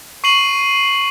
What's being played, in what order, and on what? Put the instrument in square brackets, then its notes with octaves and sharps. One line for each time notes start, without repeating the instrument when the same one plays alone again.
[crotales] C#6 C7 D#7 F#7